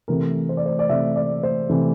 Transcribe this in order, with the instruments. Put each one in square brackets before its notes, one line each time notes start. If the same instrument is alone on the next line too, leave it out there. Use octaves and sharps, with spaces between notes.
[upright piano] C3 E3 A3 A#4
C5
D5
C5
D5
C3 E3 A3 E5
D5
C5
C3 E3 A3